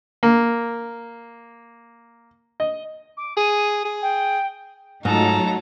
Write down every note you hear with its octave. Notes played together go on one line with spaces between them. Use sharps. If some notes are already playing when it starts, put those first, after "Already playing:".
A#3
D#5
D6
G#4 D#7
G#4
G5
G#2 F#3 A3 D#4 F4 A4 A#5